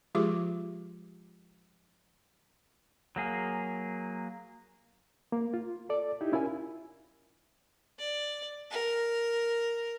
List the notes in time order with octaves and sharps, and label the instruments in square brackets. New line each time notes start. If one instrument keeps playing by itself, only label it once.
[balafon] F3 G#3 F4 G4 G#4 D6
[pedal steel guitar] F#3 A#3 G#4
[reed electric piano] A#3
F4
A4 D5
D#4 E4 G4
C#4 E4 F4 A#4 G#5
[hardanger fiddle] D5
A#4